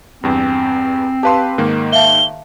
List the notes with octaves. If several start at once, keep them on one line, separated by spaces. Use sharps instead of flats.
E2 G2 C4
G4 B4 F5 A5 C6
G#2 D#3 A#3
E5 F5 A5 G7